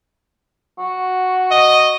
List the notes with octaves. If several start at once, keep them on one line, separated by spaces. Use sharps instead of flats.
F#4
D#5